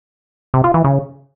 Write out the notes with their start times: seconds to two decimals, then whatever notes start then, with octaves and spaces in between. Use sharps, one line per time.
0.54 C3
0.64 F4
0.74 E3
0.84 C#3